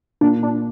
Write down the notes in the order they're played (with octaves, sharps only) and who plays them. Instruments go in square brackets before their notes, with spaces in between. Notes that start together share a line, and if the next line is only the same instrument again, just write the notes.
[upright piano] A#2 A#3 F4 [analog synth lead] D4
[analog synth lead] D4